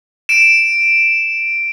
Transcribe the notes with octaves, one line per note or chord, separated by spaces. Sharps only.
D7 E7